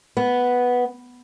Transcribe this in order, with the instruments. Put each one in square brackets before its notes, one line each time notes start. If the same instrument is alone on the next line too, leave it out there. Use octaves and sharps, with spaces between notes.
[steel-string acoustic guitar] B3